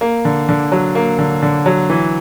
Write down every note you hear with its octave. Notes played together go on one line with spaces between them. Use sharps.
A#3
D3
D3
F#3
A#3
D3
D3
F#3
E3